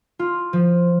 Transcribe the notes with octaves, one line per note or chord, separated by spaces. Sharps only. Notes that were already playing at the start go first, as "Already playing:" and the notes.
F4
F3